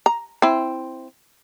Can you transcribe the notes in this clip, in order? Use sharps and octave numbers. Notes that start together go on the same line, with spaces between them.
A#5
C4 E4